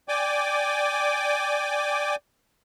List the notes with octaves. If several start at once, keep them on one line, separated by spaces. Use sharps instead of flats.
D5 G5 G#5 D6